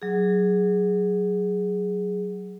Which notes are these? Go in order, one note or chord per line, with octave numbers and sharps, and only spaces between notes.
F#3 G#4